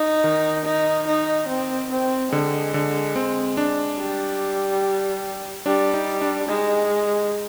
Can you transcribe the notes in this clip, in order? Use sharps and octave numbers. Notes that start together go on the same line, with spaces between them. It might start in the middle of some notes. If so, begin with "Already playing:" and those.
Already playing: D#4
D#3
D#4
D#4
C4
C4
D3 G#3
D3
C4
D4
G3
G3 D4
D#4
D4
G#3 D#4